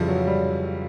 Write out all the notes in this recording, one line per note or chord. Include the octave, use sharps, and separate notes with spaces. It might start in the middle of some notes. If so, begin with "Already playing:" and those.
Already playing: F2 C#3 E3 F3 G3
F#3
G3